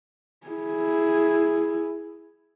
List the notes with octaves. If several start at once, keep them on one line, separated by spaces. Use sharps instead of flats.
E4 G#4